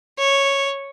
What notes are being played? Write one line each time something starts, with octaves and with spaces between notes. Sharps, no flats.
C#5